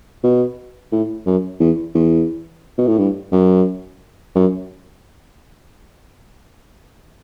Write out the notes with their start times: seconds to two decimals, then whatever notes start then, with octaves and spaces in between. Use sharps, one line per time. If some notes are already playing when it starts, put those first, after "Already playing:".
0.23 B2
0.92 A2
1.26 F#2
1.60 E2
1.95 E2
2.78 B2
2.87 A2
2.98 G2
3.32 F#2
4.35 F#2